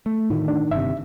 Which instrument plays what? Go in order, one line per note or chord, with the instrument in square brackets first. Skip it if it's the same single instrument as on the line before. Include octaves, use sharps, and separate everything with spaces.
[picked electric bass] A3
[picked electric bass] A2 D3 [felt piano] D#3
[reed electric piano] D4
[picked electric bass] G1 C3 [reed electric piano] E5